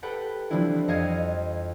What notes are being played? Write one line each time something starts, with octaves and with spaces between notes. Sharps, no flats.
G4 A4 B4 F#5 G5
E3 F3 G3 C4 D4 E4
F2 F#4 D#5 F5 G#6